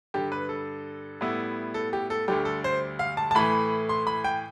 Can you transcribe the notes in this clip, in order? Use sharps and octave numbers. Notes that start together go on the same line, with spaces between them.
G2 D3 G3 G4
B4
A4
A2 G3 B3 E4
A4
G4
A4
D2 D3 G3 G4
A4
C5
F5
A5
A5
A2 E3 A3 B5
C6
B5
G5